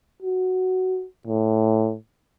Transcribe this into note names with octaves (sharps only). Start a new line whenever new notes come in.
F#4
A2